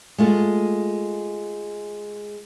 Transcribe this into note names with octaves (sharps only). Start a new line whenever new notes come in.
G#3 A3 F4